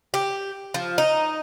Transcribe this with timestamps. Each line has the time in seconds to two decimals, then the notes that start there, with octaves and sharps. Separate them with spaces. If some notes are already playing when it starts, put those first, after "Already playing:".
0.14 G4
0.74 F3
0.98 D#4